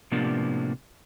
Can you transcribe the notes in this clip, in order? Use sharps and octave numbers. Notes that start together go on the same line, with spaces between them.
A2 C3 F3 A#3 B3 D4